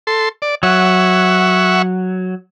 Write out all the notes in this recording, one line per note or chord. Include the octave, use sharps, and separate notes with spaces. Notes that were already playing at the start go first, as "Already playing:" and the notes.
A4 C6
D5
F#3 E5 F#5 C#6